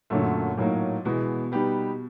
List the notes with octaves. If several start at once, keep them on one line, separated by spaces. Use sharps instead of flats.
F#2 A#2 D3 F#3 A3
A2 F#3 A#3 D#4
B2 E3 G#3 B3
G3 B3 D#4 G4 B4